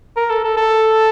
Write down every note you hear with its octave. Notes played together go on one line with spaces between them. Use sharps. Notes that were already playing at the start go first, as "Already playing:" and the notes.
A#4
A4
A4
A4